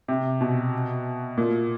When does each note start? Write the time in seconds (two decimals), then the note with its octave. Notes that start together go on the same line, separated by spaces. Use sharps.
0.08 C3
0.41 B2
1.38 A#2